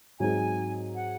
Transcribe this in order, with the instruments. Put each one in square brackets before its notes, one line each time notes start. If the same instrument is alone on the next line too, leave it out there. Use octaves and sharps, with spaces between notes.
[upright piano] G#2 F#3 C4 D#4 G#4 [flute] G#5
[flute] F#5